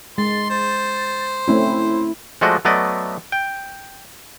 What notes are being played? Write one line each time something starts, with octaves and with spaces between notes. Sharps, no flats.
G#3 C6 A6
C5
A3 C4 C#4 E4
F3 G#3 A3 F#4 D5 D#5
F#3 A3 B3 D5 D#5
G5